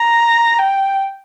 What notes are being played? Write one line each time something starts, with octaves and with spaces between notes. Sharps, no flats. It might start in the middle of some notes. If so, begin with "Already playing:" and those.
Already playing: A#5
G5